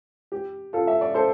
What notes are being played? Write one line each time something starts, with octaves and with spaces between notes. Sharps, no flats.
G4
F4 A4
E5
D5
A4 C5